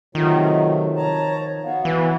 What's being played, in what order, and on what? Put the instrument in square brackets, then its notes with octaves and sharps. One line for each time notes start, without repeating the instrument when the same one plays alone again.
[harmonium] C3 F#3 A3 [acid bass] D#3 [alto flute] F4
[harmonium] F3 A5 A#5 [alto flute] C#5
[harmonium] B3 F#4 [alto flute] F5
[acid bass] E3 [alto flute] B4